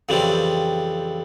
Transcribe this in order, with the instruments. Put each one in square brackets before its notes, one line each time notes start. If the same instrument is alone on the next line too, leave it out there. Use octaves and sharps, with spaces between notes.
[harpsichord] F2 C#3 E3 G3 C4